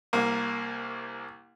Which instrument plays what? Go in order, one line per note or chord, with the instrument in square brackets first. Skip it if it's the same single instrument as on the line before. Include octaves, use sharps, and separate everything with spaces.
[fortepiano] C2 A#3